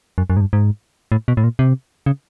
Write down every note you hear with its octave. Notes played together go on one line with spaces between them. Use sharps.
F#2
F#2
G#2
G2
G#2
A2
B2
A2
A#2
C3
C#3